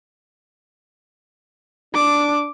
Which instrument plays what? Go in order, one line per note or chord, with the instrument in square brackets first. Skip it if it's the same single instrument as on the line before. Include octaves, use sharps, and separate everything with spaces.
[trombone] D4 [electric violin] D6